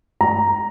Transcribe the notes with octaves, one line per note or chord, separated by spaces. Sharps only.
A#5